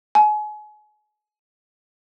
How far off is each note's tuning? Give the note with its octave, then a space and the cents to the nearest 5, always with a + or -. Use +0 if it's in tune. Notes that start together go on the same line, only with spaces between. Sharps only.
G#5 +35